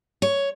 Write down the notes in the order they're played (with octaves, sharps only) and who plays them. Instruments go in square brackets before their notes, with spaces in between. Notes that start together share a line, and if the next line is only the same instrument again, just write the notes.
[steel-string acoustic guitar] C#5